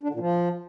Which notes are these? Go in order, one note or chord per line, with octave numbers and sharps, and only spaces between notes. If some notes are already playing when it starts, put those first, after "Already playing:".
D4
D3
A#2
F3